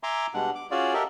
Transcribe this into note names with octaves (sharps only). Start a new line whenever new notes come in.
E5 G#5 A#5 C6 D6
B2 G3 G#3 D4 F#5
D6
C#4 F4 F#4 G#4 D5
G4 A4 A#4 D#5 E5